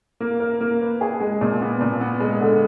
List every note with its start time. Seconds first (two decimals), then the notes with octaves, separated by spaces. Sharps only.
0.20 A#3
0.40 A#4
0.61 A#3
0.81 B4
1.01 G#4
1.20 G#3
1.41 A#2
1.61 B3
1.81 A#2
2.01 B3
2.20 G#3
2.41 D3